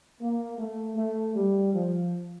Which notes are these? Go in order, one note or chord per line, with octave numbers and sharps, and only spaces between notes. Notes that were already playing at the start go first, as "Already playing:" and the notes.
A#3
A3
A3
G3
F3